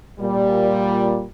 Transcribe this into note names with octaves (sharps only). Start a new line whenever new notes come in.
A#2 G3